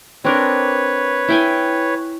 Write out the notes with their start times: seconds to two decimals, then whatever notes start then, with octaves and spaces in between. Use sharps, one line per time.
0.24 C4 D4 A#4 B4 C#5
1.28 E4 G5 G#5